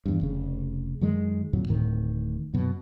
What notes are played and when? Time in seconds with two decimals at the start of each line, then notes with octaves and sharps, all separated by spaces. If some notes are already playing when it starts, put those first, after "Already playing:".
0.06 E2 G2
0.21 F1 C#3
1.01 F#2 D#3 G#3
1.53 F2 A#2 D#3 F#3
1.68 D1 A2 D#3
2.54 F#2 B2